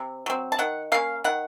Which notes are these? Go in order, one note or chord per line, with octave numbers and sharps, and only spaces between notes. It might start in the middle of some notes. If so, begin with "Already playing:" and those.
Already playing: C3
F#3 C4
A5
D#3 F#5
A#3 C#4 F5
D#3 F#5